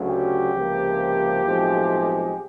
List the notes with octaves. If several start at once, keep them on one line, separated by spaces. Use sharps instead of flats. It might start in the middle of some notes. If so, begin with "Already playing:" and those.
Already playing: D2 C#3 F#3
G4
C#2 C3 F3 A#3
B1 A2 F3 G#3 C4